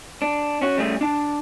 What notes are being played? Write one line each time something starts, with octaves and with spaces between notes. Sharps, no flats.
D4
C#4 F#4
C#3 G3 A3 G#4
D4 A5